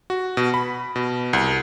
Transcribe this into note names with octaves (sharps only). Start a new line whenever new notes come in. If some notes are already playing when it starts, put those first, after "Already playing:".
F#4
B2
B5
B2
C2